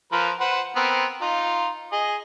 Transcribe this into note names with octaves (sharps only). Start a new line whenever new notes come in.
F3 A#4 B4
B4 C5 F#5
B3 C4 A#4
D#4 F4
G#4 D#5